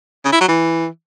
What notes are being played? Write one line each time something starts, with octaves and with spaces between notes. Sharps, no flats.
C#3
E4
F#3
E3